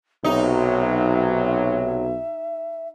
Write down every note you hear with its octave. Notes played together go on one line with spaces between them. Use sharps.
B1 C3 F#3 D#4 E5